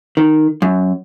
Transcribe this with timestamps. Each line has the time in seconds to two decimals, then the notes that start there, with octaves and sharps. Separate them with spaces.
0.17 D#3
0.62 F#2